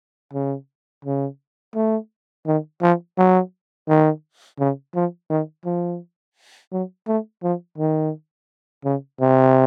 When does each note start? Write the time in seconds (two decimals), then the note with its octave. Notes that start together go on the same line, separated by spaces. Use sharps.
0.33 C#3
1.05 C#3
1.75 A3
2.46 D#3
2.82 F3
3.18 F#3
3.88 D#3
4.59 C#3
4.95 F3
5.30 D#3
5.65 F3
6.72 F#3
7.07 A3
7.43 F3
7.78 D#3
8.84 C#3
9.20 C3